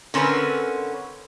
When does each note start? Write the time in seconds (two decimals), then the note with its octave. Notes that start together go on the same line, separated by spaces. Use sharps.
0.14 D3 C4 C#4 A#4 B4